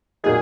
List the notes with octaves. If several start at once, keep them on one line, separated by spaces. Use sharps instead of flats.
A#2 F#3 A#3 D#4 G#4